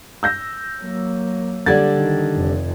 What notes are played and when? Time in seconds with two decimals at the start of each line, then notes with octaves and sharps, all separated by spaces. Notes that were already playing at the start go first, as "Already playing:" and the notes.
0.23 E6 G6 A#6
0.81 F#3 A#3
1.66 D3 G3 D5 G#6 A6
1.97 D#3
2.35 F1 F2